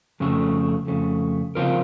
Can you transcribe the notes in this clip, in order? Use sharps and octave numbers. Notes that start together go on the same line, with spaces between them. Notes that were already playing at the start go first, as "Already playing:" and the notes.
F2 C#3 A3
F2 C#3 A3
C#3 F3 C4 F4 A#4